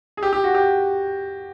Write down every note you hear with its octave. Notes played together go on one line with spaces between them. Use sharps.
G#4
G4
G4
F#4
G4